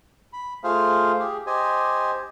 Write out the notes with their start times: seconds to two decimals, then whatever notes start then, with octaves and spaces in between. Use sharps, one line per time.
0.33 B5
0.64 A3 F4 G#4 C5 F5
1.19 G4 G#4
1.47 G4 C5 D#5 G#5